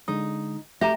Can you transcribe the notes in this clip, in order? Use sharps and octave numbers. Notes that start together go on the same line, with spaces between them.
D3 G#3 D#4 D#6
A3 G4 E5 A#5